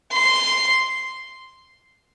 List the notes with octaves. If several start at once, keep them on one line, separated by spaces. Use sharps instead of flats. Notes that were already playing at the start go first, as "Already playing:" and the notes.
C6